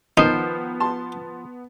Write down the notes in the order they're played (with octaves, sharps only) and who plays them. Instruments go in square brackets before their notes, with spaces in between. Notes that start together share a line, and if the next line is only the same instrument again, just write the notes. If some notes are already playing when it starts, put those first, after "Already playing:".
[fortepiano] D#3 [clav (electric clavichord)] F3 C5 [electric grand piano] B3 [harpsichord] D#4
[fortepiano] A5 C6